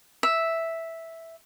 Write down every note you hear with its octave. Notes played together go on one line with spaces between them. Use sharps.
E5